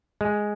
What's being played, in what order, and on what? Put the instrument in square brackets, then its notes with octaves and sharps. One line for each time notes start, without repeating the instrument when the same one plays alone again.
[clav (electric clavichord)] G#3